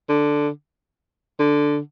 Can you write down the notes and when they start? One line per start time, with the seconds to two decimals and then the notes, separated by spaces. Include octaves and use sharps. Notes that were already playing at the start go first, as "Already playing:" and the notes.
0.09 D3
1.39 D3